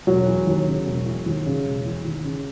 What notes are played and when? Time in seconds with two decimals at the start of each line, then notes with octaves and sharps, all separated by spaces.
0.07 E1 F#3 F#4
0.26 E3
0.47 D#2
0.66 C#3
0.86 E1
1.06 E3
1.26 D#2
1.46 C#3
1.66 E1
1.85 E3
2.05 D#2
2.24 C#3